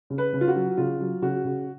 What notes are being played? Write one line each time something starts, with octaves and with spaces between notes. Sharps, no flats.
C#3
B4
C#3
F4
F#4
F#3
C#3 F4
F#3
C#3 F#4
C#3